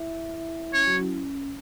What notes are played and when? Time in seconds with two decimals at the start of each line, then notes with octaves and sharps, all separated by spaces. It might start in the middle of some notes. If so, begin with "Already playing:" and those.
Already playing: E4 E5
0.35 E4 E5
0.66 E4
0.73 C#4 C#5
0.86 F#3 F#4
0.95 C#4
1.00 E4
1.12 C#4